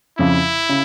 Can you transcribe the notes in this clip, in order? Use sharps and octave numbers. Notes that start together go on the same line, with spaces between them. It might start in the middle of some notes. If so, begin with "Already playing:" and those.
F2 C#3 F3 E4
C#3